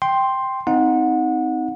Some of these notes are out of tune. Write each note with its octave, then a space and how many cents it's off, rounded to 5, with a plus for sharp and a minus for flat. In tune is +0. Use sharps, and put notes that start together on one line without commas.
G5 +0 C6 +5
C4 -15 D#4 +20 F#5 -25